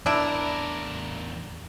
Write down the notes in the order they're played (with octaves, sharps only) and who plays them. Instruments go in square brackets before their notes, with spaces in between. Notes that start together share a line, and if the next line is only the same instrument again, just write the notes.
[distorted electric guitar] E2 A#4 [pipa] D4 E4 D5